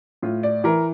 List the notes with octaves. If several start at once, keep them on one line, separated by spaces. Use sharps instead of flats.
A2 F4
D5
E3 A#4